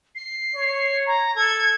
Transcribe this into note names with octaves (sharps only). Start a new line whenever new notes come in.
C7
C#5
A#5
A4 G#6